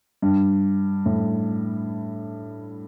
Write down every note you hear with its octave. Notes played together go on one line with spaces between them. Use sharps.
G2
A2